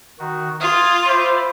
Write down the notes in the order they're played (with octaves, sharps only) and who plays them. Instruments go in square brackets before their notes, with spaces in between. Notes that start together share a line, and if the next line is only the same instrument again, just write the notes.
[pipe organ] D#3 F#4
[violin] F4 [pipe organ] D#6 F6 G#6
[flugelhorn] C5 [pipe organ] E5 B5 D6